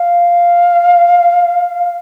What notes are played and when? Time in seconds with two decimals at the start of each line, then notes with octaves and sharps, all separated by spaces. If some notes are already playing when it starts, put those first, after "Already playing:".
Already playing: F5